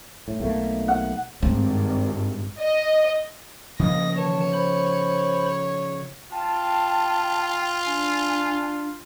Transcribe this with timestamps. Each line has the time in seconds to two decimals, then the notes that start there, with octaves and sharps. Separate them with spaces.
0.28 A2
0.40 B1 A3 A#3
0.88 F#5
1.42 G#1 G2 C4
2.60 D#5
3.79 C#3 F3 A#3 D#5 D#6 A#6
4.17 D#3 E3 C#5 A5
4.53 C5 B5
6.32 F4 G5 A5
7.86 D4 G#5